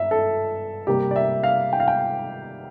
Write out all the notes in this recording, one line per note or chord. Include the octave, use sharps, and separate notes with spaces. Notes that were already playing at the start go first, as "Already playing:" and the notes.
Already playing: G2 E5
A4
C3 G3 A#3 G4
D5
E5
F5
G5
F5
G5